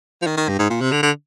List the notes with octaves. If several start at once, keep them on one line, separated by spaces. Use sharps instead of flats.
F3
D#3
D#3
G2
G#2
A#2
C3
D3
D3